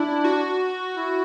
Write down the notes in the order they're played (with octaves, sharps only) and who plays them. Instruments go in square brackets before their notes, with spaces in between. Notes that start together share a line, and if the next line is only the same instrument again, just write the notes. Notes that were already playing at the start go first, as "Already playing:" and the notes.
Already playing: [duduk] D4 [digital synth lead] E4
[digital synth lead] F#4
[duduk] E4